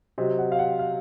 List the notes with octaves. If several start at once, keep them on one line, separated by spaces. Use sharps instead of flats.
C3 F#3 D#5
F#5
F5
F#5
F5